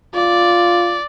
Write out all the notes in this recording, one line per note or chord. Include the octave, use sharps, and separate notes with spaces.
F4 D5